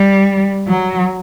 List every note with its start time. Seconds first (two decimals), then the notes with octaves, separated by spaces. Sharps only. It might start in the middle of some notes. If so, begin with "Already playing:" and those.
Already playing: G3
0.67 F#3